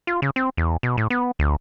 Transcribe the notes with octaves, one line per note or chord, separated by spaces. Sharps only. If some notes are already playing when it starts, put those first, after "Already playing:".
F4
C#3
C4
E2
B2
A2
B3
D2